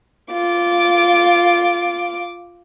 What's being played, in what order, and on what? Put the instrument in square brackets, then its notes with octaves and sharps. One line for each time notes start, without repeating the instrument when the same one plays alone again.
[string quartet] F4 D6